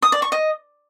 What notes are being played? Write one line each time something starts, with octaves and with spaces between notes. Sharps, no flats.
D#6
D5
C#6
D#5